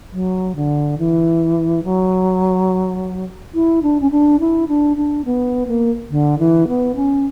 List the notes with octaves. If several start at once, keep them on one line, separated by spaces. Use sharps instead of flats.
F#3
D3
E3
F#3
E4
D4
C#4
D4
E4
D4
D4
B3
A#3
D3
E3
B3
C#4